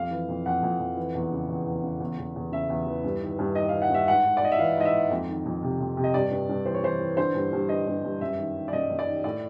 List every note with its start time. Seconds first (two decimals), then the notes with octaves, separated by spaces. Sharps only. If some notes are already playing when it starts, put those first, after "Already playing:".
Already playing: F2 F5
0.11 E3
0.29 F2
0.46 F2 F#5
0.63 F2
0.79 F2
0.97 E3
1.15 E2
1.32 C#3
1.48 E2
1.66 E2
1.83 C#3
2.00 E2
2.18 E2
2.36 E2
2.52 C#3 E5
2.70 E2
2.86 E3
3.04 G2
3.21 D#3
3.39 G2
3.55 D#3 D#5
3.69 D#3 F5
3.82 F#5
3.90 G2 E5
4.08 G#2 F#5
4.25 G#2
4.37 D5
4.41 G#2 D#5
4.52 E5
4.58 E3 F5
4.76 G#2 D#5
4.85 E5
4.93 G#2
5.10 F2
5.28 D#3
5.46 F2
5.63 C3
5.79 F2
5.97 C3
6.04 D#5
6.14 G2 D5
6.31 G2
6.49 G2
6.66 E3 C5
6.74 C#5
6.83 E3 C5
7.00 E3
7.17 D3 C5
7.35 G2
7.53 G2
7.69 D3 D#5
7.87 G2
8.04 G2
8.21 F#2 E5
8.38 D#3
8.56 D#3
8.68 D5
8.73 F#2 D#5
8.90 F#2
8.99 D5
9.07 D#3
9.24 A2 D5